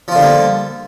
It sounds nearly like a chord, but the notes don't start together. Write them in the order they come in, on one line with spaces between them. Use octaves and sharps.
F3 F4 D3 G3 A#3